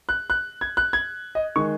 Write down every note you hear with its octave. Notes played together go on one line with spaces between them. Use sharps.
F#6
F#6
G#6
F#6
G#6
D#5
D#3 G#3 C#6